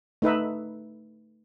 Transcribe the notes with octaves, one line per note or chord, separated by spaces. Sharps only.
A3 D#4 B4 E5